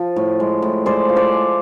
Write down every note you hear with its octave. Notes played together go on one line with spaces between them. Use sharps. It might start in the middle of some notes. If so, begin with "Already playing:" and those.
Already playing: F3
A2
G#3
A2
G#3 C5 D5
F3
C5 D5
G#3